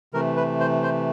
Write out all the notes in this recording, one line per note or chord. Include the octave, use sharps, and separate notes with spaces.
C3 E3 A3 A#4
B4
C5
C5